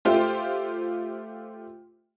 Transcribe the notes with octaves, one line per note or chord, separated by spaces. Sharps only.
A3 F4 G4 C5 G5